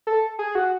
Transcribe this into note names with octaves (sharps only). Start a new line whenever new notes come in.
A4
G#4
F#4